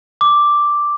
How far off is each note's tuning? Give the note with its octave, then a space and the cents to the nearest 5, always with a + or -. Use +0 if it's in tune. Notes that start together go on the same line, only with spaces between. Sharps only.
D6 +0